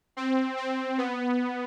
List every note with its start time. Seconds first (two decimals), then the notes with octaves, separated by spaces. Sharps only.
0.17 C4
0.57 C4
0.98 B3